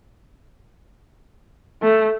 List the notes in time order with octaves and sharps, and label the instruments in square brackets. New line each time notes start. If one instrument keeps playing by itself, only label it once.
[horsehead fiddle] A3